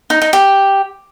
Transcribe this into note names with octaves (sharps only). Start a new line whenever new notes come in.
D#4
D#4
G4